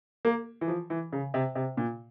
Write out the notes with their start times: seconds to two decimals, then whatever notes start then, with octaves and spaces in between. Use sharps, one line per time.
0.25 A#3
0.61 E3
0.68 F3
0.90 E3
1.13 C#3
1.34 C3
1.55 C3
1.77 A#2